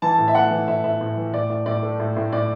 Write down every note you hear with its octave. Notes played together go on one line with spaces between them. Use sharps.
E3 A5
A2
E5
A3 F#5
E3
A2 E5
A2 E5
A2
E3
A2 D5
A2
A2 D5
A3
A2
A2
A2 D5